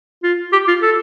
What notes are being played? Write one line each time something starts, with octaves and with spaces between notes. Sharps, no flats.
F4
G4
F4
A4